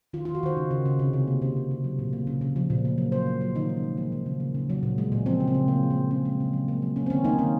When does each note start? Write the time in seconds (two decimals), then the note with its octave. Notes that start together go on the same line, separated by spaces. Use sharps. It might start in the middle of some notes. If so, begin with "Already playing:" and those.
0.13 D#3 F4
0.25 F4
0.29 D#3
0.35 F#4
0.43 D#3 C5
0.57 C#3
0.71 C#3
0.86 C#3
0.99 C3
1.13 C3
1.27 A#3
1.42 C#3 C5
1.56 C#3
1.71 C#3
1.84 F#3
1.99 A#2
2.13 A#3
2.27 C#3
2.41 C#3
2.56 F3
2.70 A#2
2.85 A#3
2.98 F#3
3.12 F#3 C5
3.26 A#3
3.41 F#3
3.55 D#3 D#4
3.69 D#3
3.77 C#4
3.83 G#3
3.97 F3 A#3
4.12 C#3
4.26 C#3
4.40 A#3
4.55 C#3
4.70 F#3
4.83 A#2
4.98 G#3
5.12 A#2
5.26 F3 C4
5.40 C#3
5.48 C4
5.54 C#3
5.68 A#3 C#4
5.83 F3
5.90 A#3
5.97 A#2
6.11 C#3 C4
6.25 G#3
6.40 C#3
6.53 F#3
6.68 A#3
6.82 F#3
6.96 A#3 C#4
7.06 C4
7.10 D#3 C#4
7.24 A#3 D#4
7.39 D#3 C#4